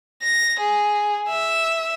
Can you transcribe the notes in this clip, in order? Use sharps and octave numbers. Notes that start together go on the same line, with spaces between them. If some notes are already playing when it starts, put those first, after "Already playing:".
A#6
G#4
E5